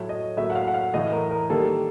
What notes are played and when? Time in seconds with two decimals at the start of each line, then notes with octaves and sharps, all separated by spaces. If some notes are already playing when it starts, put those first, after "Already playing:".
Already playing: A2 F#3 A3 C#5
0.09 D#5
0.37 A2 F#3 A#3 E5
0.50 F#5
0.55 F5
0.68 F#5
0.74 F5
0.94 A2 E3 A3 D#5
1.12 A#4
1.31 A#4
1.49 D#3 G3 A#3 A4